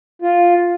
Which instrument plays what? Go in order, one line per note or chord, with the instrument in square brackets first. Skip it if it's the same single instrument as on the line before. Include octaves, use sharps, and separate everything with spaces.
[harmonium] F4